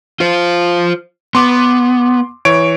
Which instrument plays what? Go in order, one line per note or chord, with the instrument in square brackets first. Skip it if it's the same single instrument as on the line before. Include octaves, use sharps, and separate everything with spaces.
[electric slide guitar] F4 C5
[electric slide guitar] B3 [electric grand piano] C6 D6
[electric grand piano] E3 C#5 D7